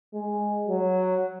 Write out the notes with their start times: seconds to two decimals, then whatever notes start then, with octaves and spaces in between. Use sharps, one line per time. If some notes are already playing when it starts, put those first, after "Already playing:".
0.14 G#3
0.67 F#3